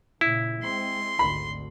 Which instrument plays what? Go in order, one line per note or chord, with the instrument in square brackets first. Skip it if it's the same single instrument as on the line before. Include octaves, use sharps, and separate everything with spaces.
[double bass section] A#2 C#3 [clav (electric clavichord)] E4
[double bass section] G#3 C4 [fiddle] C6
[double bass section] G#1 D2 D3 [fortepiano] B5